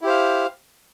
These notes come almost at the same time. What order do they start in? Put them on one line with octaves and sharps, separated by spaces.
E4 G4 C5 F5